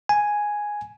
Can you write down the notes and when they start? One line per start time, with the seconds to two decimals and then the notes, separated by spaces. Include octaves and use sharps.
0.09 G#5